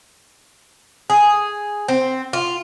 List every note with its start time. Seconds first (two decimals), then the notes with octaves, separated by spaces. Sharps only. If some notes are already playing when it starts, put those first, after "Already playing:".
1.10 G#4
1.88 C4
2.33 F4